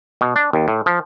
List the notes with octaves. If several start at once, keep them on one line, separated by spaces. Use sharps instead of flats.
B2
D4
D#2
A2
F3